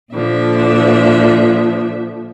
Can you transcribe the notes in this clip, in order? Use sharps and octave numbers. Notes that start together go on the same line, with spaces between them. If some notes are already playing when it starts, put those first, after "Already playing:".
A#2 D3 F3 E5